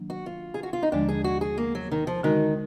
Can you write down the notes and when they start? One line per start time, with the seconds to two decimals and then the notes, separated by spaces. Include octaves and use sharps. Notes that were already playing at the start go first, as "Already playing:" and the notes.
Already playing: D#3 F#3 A#3 D4
0.10 F#4
0.26 F4
0.54 G#4
0.63 F#4
0.73 F4
0.83 D#4
0.92 D#2 D3 F3 G#3 D4
1.09 G#4
1.24 F#4
1.41 G#4
1.57 A#3
1.75 F#3
1.91 D#3
2.07 F3
2.23 D3 D#3 G#3 D#4 F#4